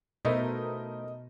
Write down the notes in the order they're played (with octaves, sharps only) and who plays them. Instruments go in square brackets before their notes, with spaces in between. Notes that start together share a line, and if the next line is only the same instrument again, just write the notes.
[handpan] B2 [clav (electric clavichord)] A3 D#4 E4 [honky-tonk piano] A4 A#4 C5 [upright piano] D#5